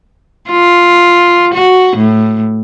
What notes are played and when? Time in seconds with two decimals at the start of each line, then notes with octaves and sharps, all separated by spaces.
0.50 F4
1.54 F#4
1.97 A2